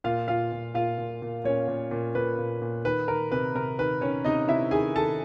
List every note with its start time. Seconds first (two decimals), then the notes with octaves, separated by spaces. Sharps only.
0.04 A#2 F4 F5
0.28 A#2 F4 F5
0.52 A#2
0.74 A#2 F4 F5
0.98 A#2
1.22 A#2
1.44 A#2 C#4 C#5
1.68 A#2
1.91 A#2
2.15 A#2 B4
2.38 A#2
2.62 A#2
2.85 D#3 B4
3.08 D#3 A#4
3.32 C3 B4
3.55 C3 A#4
3.78 D#3 B4
4.01 D#3 C#4 C#5
4.24 C3 D#4 D#5
4.48 C3 E4 E5
4.71 D#3 G#4 G#5
4.95 D#3 A4 A5